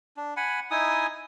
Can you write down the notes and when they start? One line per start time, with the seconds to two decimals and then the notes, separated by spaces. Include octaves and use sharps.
0.17 D4
0.37 F#5 G#5 B5
0.71 D#4 E4 G#5 D#6